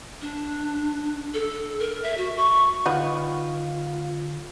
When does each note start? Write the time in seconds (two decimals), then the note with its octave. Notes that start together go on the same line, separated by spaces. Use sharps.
0.22 D4
1.34 A4
1.80 A#4
2.03 E5
2.17 F#4
2.37 C#6
2.86 D3 D#3 F4 B4 F#5